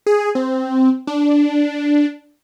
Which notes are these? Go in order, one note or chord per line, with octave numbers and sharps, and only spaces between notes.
G#4
C4
D4